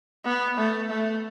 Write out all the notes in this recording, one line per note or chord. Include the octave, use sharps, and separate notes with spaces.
B3
A3
A3